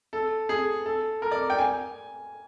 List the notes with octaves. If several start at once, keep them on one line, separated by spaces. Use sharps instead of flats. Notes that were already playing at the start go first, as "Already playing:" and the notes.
A4
G#4
A4
A#4
D5
G5
G#5